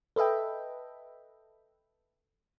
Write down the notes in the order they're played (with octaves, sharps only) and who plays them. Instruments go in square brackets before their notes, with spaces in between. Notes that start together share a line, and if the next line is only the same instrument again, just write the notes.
[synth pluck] A4 B4 D#5 E5 G5